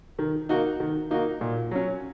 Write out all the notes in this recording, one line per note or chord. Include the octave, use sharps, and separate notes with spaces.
D#3
A#3 D#4 F#4
D#3
A#3 D#4 F#4
A#2
F#3 C#4